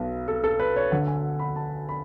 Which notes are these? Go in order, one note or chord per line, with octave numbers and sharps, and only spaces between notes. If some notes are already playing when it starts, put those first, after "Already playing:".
Already playing: B1 B2 B4
A4
A4
B4
C#5
D2 D3 F#5
G#5
B5
A5
B5